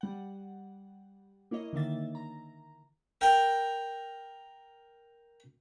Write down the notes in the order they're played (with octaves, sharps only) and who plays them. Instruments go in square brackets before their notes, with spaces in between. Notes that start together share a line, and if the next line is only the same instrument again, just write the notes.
[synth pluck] G3 F#5
A#3 E4 C#5 D#5
D3 D#3 A#3 E5 A6
A#5
[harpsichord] A#4 G5